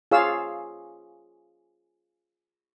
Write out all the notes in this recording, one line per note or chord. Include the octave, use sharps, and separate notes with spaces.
F4 G#4 C#5 F5 E6